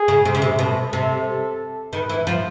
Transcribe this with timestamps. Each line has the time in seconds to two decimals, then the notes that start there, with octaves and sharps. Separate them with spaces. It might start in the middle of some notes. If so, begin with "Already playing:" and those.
Already playing: G#4
0.08 C#3
0.25 C3
0.35 C#3
0.42 C3
0.59 B2 A4
0.93 C3 A4
1.93 D#3 B4
2.09 E3
2.27 F3